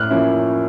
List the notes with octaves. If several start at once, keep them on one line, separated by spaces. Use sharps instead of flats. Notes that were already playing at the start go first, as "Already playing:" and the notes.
Already playing: A2 F6 F#6
F3 A#3 C#4 E4